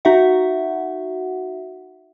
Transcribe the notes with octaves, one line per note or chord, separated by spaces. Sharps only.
D#4 F#4 E5 F#5